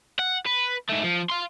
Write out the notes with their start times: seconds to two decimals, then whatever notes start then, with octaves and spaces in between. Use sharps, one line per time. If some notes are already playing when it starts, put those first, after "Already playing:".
0.19 F#5
0.46 B4
0.89 G#2 A3
1.03 F3
1.30 F5 C6